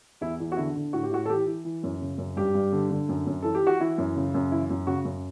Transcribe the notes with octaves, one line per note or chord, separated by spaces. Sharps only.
E2 E4
E2
F#4
D3 E4
D3
A2 F#4
G4
A2 F#4
A4
E3 G4
E3
E3
F#2
C#3
F#2
G2 G4
G2
D3
D3
F#2
F#2
E3 A4
G4
E3 F#4
E3 E4
F#2
C#3
F#2
E3 E4
F#2
C#3 F#4
F#2